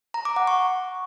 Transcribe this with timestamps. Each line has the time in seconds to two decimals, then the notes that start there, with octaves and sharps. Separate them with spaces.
0.14 A#5
0.25 D6
0.36 F#5
0.47 C#6